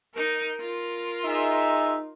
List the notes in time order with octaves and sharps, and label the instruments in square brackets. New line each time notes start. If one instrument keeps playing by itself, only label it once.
[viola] D#4 A#4
F4 A#4
[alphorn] D#4 [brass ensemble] G#4 E5